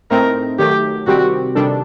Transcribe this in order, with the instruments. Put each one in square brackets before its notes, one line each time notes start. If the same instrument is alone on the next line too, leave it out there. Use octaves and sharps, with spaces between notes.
[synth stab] A2 A3 C4 D#4 [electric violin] A#4
[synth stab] D#3 F#3 A3 [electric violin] G4
[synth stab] C3 D#3 G3 C4 G4 [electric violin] F#4
[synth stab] C3 D#3 G3 D4 A4